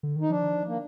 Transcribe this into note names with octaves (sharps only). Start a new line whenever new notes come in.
D3
D#3 D#4
F3 D4
A#3